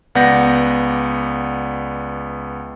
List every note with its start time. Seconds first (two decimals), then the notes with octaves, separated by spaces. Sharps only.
0.15 C#2 B3 D5 F#5 G6 A#6